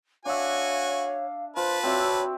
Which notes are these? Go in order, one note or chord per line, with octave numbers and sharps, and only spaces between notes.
D4 F#4 C#5 E5 F5 G#5
F4 B4 C5 A5
C4 F#4 C#5 D5 E5